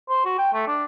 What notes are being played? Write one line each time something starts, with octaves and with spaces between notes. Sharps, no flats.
C5
F#4
G5
A3
D4